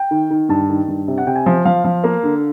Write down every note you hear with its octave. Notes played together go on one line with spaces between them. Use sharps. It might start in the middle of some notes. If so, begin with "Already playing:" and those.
Already playing: G5
D#3
D#3
G2 A5
D#3
G2
C3
F#5
C3 G5
G#5
F3
F3 F5
F3
A#3
D3